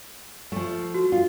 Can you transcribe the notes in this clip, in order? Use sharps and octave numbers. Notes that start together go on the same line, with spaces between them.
F3 A3
F#4
F4